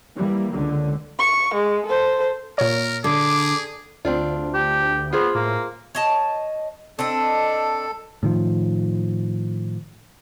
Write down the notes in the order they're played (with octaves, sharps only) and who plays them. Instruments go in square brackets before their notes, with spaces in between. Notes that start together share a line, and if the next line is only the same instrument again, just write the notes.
[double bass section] E3 G3 A#3
C#2 D3
[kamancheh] C#6
G#3
A4 C5
[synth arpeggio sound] A#2 C#5 [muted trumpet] A#4
[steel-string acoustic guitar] D3 [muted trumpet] G#4 [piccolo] D6
[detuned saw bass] D2 [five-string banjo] C4 D4 F4
[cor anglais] G4
[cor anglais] B3 [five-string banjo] F4 G#4 C5
[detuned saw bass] A2 [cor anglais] A#3
[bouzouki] C#5 D#5 A5
[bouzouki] C4 D4 D#5 [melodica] A4
[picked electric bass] A2 D#3 F3